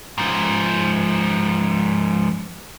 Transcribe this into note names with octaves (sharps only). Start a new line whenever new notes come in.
G#2 F3